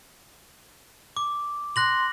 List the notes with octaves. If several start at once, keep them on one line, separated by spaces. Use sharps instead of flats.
D6
C6 F#6 A#6 F#7